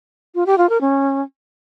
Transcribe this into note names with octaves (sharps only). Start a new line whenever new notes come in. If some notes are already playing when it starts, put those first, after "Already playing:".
F4
G4
F4
A#4
C#4